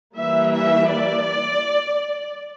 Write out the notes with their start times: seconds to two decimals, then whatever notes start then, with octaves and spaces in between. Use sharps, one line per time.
0.15 E3 G3 A#3 E5
0.53 E5
0.91 D5